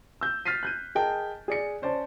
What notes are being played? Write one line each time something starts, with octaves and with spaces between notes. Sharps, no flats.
E6 G6
F6 A6 B6 C7 D#7
F#6 G6 D#7
G#4 A#4 D#5 G5 A5
G#4 D5 C#7
C#4 C5 D5 A5